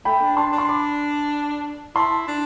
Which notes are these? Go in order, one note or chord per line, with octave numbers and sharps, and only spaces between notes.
A3 G5 B5
D4
D4 A5 C6
D4
C6
B5 D6
E4 A5 C6
D4